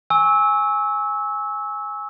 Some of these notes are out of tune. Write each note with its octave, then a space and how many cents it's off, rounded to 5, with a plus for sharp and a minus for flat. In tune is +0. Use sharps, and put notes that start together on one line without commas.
G#5 +0 C#6 +0 E6 -20